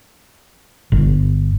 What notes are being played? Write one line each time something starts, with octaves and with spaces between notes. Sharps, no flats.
G1